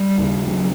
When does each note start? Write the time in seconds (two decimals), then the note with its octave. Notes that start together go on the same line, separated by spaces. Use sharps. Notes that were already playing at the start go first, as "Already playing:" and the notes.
Already playing: G3
0.18 D#2 C#3
0.47 G3
0.51 F#3